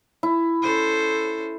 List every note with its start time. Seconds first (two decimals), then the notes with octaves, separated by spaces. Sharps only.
0.23 E4
0.62 C#4 A4 C5